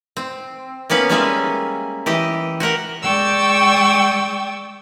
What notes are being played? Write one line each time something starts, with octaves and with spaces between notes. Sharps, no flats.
C4
A#3 B3 C#4 B4
G3 G#3 A#3 C#4 G#4 E5
E3 G4 D#5
F#4 G4 A#4 F#5
G#3 D5 G5 C#6 D6 E6